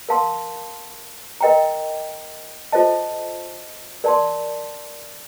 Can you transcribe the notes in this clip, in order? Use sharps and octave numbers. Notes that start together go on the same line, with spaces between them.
A#4 F5 A5 C6
A#4 D#5 G5 A#5
F4 A4 C5 D#5 A5
A#4 D5 A5 C6